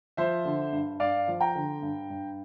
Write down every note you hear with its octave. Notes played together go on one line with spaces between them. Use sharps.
F3 C5 E5
D3
G2
G2 D5 F5
F3
G5 A#5
D3
G2
G2